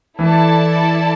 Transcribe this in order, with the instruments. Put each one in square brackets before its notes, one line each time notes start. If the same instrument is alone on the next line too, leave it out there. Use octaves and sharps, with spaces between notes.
[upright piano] E3 [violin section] E4 A4 D5 A5